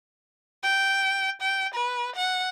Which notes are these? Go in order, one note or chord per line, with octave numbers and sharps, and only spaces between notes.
G5
G5
B4
F#5